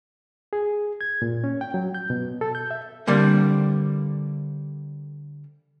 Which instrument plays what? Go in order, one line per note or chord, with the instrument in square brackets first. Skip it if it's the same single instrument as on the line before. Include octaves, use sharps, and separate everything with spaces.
[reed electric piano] G#4
G#6
A#2
C#4
G5
F#3
G6
B2
A4
G6
E5
[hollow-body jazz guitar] D3 G3 A#3 C4